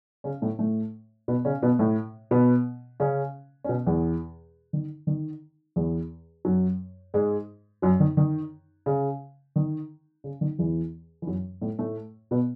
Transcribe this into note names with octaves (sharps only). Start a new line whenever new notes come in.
C#3 C#4
A2 A3
A2 A3
B2 B3
C#3 C#4
B2 B3
A2 A3
B2 B3
C#3 C#4
C#4
B2 B3
E2 E3
D#3
D#3
E2 E3
F#2 F#3
G#2 G#3
F#2 F#3
D#3
D#3
C#3
D#3
C#3
D#3
E2 E3
E3
F#2 F#3
A2 A3
A2 A3
B2 B3